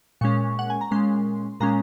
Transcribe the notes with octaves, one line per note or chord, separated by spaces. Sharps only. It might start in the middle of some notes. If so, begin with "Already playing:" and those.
A#2 G#3 C#4 C#6
F#5
G#5
A#5
A#2 G#3 C#4 C6
A#2 G#3 C#4 A#5